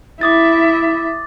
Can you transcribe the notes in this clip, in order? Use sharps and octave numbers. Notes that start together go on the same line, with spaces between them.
E4 E5 D6 D#6 A6